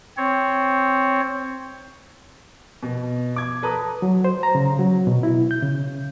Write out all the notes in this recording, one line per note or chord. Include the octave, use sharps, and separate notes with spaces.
C4 C#5
B2
D6 G#6
A4 B4 A5 A#5 D#6
F#3
C5
A#5
C#3
F#3
B2
E4
G6
C#3